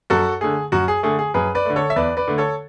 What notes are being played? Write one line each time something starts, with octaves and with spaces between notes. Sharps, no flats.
F#2 F#4 A4
D3 A3 G#4
F#2 F#4
G#4
D3 A3 G#4
G#4
F#2 G#4 B4
B4 D5
D3 A3
A4 C#5
E5
E2 B4 D5
B4 D5
D3 A3
A4 C#5